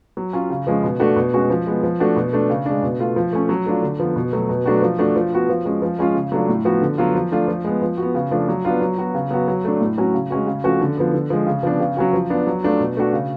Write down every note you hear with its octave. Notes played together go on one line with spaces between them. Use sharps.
F#3
C#4 F4
C#3
F3 G#3 C#4
B2
A3 D4 F#4
B2
G#3 C#4 F#4
F3
G#3 B3
F3
A3 D4 F#4
B2
A3 D4
C#3
G#3 D4
B2
A3 F4
F3
A3 C#4
F#3
A3 D4 F4
D3
F3 B3
B2
F#3 A3
B2
F#3 A3 D4 F#4
F3
A3 D4 F#4
F3
B3 F#4
F3
G#3 C#4
F3
G#3 C#4 F4
C#3
F#3 A3 D4 F4
A2
F3 B3 F#4
D3
F#3 B3 F4
F3
A3 D4 F4
F3
G#3 B3
F3
B3 F#4
C#3
F3 A3 D4
F#3
B3 D4 F4
F#3
B3 F#4
C#3
F#3 B3 F#4
F#3
A3 D4
A2
F#3 C#4 F#4
C#3
G#3 C#4 F#4
C#3
F3 A3 C#4 F#4
D3
F3 B3
D3
F3 G#3
C#3
F3 B3 D4
C#3
F#3 C#4 F#4
F3
B3 D4 F4
F#3
A3 D4 F4
B2
A3 D4 F#4
C#3